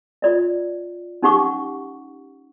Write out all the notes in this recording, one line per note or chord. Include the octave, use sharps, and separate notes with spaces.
F4 D5 D#5
C#4 D#4 G4 F#5 C#6 D6